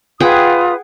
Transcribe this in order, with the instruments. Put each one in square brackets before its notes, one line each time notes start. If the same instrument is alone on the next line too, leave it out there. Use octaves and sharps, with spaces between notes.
[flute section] F4 B4 D#6 [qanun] G#4 F#5 G5